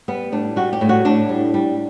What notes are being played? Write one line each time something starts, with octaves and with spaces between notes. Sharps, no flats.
G3 B3
A2 D4
G3 F#4
G4
A2
F#4
A2 D4
G3
G3